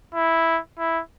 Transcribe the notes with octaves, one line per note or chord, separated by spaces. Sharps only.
E4
E4